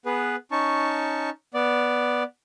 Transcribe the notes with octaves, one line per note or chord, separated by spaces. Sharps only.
B3 G#4 B4
C#4 D#4 A5 C#6
B3 D5